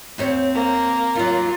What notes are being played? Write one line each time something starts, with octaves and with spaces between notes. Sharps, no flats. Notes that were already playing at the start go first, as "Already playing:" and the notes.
D#2 C4 C5 C#5
A#3
D#2 F#3 F4